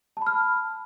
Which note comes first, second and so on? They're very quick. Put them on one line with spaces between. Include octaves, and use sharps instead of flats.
A5 B5 F6